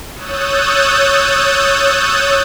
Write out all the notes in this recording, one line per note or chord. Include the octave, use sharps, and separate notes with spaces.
C#5 D#6 E6 F#6 G6 A6